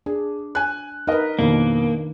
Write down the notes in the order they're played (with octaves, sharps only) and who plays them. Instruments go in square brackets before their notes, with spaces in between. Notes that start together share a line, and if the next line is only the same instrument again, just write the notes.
[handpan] D4 [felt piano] G#4
[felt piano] G#5 F#6
[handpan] D#4 B4 [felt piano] A#4 D#5
[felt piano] F2 B2 [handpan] D#3 D4 [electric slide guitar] A#3